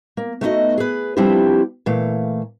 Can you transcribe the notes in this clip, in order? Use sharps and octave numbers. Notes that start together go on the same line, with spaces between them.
A#3
A3 B3 D#4 E4 F#4 D#5
G#4 B4
F3 G3 C4 D4 E4 G4
A#2 E3 A3 F5